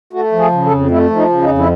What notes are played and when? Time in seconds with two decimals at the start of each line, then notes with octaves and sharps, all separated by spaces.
0.13 A3 F#4
0.32 F3
0.39 G#4
0.52 C#3
0.65 A4
0.71 F2
0.91 A3 E4
1.10 F3
1.16 D#4
1.29 C#3
1.42 D#4
1.49 F2
1.58 E4